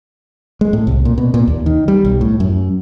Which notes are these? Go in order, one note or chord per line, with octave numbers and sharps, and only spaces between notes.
G#3
A2
C2
A#2
B2
A#2
D#2
D#3
G3
B1
A2
F#2